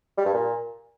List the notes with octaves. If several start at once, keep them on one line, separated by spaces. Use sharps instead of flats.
G3
G2
A#2